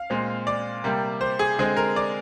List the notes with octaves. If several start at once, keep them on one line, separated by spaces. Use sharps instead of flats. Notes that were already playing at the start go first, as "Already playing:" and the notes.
Already playing: F5
A#2 G#3 C4
D5
C3 G3 A#3
C5
G#4
D3 G#3 C4 G#4
A#4
D5